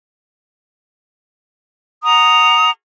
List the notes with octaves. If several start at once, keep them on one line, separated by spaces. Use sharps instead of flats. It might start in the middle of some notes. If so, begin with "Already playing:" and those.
F#5 A#5 D#6